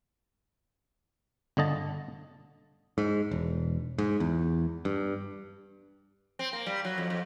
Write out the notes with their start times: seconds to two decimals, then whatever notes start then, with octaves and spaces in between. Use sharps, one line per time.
1.57 G1 D3 D#5 A5
2.98 G#2
3.31 E1
3.98 G#2
4.20 E2
4.85 G2
6.39 C4
6.53 A#3
6.66 G3
6.85 F#3
6.98 F2
7.10 F2